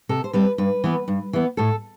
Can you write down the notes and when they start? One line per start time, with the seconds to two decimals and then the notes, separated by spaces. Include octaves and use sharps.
0.09 C3 A4
0.24 C5
0.33 G3 C4 B4
0.58 G2 B4
0.84 E3 B3
1.08 G2
1.33 E3 B3
1.57 A2 A4